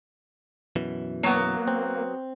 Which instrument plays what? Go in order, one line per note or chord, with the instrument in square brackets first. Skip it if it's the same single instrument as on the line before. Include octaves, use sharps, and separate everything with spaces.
[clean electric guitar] F#2 B2 E3
[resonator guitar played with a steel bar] F#3 B3 [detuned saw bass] A#3
[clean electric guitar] C4